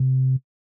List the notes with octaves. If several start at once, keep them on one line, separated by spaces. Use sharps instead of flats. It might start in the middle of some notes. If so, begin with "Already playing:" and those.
Already playing: C3